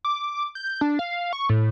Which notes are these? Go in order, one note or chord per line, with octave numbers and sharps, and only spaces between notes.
D6
G6
D4
F5
C#6
A2